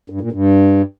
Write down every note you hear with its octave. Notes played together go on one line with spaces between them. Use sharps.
G2
A#2
G2